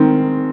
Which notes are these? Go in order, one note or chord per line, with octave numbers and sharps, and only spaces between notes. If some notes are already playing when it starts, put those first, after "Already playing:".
Already playing: D#3 G#3 C4 A#4